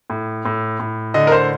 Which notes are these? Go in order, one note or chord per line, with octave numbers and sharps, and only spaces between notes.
A2
A2
A2
D3 D#5
A#4
C5